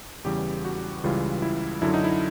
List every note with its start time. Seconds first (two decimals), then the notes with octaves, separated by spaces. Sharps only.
0.25 E2 C#3 E3 G3 G4
0.65 F#4
1.04 C#2 C#3 E3 G3 F4
1.42 E4
1.82 F#2 D3 F#3 E4
1.94 D#4
2.04 E4